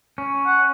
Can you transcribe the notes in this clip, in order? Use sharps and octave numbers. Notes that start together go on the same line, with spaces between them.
C#4
F#5